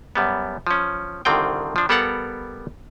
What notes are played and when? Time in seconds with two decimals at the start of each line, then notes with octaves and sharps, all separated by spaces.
0.15 F#2 G3 B3
0.67 F3 C#4
1.25 C2 D3 D#3 C4 F4 G5
1.76 F3 D4
1.89 G3 B3 A4 A#4 F5 F#5